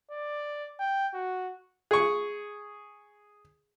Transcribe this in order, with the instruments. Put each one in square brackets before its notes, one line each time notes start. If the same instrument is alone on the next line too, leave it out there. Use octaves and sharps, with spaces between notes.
[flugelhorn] D5
G5
F#4
[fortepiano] G#4 C#6